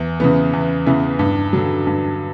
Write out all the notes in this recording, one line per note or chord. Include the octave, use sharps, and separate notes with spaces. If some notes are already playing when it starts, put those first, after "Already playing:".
Already playing: E2
C#3 E3 B3
E2
C#3 E3 B3
G2
D3 F#3
G2